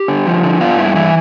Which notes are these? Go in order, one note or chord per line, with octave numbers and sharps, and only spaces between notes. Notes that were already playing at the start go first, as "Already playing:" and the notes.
Already playing: G4
D3
F3
D3
B3 F4
G2 E4
E3 E4